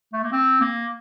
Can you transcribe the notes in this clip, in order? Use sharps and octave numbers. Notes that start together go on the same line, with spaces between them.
A3
A#3
C4
A#3